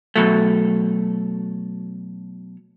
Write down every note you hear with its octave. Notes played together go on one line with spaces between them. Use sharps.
B2 F#3 A3